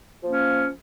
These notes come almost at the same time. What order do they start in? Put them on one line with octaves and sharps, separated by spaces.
F3 A#3 C#4